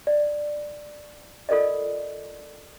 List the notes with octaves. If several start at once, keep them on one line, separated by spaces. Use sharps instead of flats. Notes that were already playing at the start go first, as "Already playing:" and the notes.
D5
F4 A4 A#4 D5 D#5